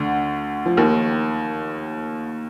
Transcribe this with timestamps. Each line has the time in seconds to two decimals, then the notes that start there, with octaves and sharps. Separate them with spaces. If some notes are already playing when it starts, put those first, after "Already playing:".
Already playing: D2 D3
0.66 F3
0.77 D#2 D#3